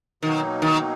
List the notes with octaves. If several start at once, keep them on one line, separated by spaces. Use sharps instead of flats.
B2 D#3 F#3 A#3 D#4
D#3